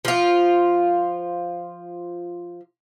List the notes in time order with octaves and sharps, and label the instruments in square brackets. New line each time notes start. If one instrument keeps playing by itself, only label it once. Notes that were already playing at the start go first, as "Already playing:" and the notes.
[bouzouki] F3 F4